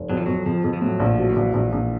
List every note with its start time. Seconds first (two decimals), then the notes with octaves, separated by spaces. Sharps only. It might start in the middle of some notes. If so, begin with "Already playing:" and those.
Already playing: F1
0.10 F2 F#3
0.17 F3
0.26 F2 F#3
0.46 F2 F3
0.64 F2
0.73 F3
0.81 A2 F#3
1.00 A#1
1.06 F3
1.18 F#3
1.30 E3
1.36 A#1
1.54 A#1
1.72 A#1